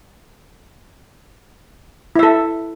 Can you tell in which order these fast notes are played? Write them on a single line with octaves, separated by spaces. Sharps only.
E4 E5 A4